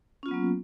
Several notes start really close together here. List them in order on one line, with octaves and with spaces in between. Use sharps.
C#4 F4 B3 F#3 A#3